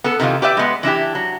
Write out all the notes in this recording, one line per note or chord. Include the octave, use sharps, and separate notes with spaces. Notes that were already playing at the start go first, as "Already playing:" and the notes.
B3 A4
C3 D#3 E3 F4
G4 B4 D5 E5
G#3 B3
E3 D4 E4 G4
F#3